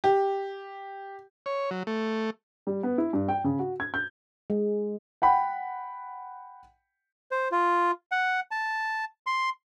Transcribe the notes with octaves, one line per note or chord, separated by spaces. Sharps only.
G4
C#5
F#3
A3
G3
B3
E4
G2
G5
C#3
F#4
G#6
G6
G#3
F#5 G5 B5
C5
F4
F#5
A5
C6